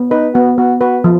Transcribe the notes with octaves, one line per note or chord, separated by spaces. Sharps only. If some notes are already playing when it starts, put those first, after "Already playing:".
Already playing: B3
D#4 B4
B3 F#4
B3 F#4
F#4 B4
F3